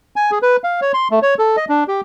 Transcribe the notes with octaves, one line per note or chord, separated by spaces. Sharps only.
G#5
G#4
B4
F5
C#5
C6
A3
C#5
A4
D#5
D4
G4